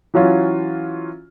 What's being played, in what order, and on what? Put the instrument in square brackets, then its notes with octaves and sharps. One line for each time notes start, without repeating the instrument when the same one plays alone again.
[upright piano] E3 F#3 C#4 F4